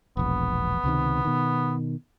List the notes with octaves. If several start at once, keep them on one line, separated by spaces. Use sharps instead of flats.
E1 A#1 B3
C#2 C3 D#3
B2 D#3